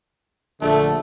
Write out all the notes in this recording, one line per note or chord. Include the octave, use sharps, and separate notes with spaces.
A#1 D3 A3 A4